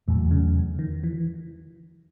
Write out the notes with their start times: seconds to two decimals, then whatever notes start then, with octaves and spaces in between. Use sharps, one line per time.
0.08 E2 A2 C3 F#3 A3
0.31 C#3
0.79 D#3
1.04 E3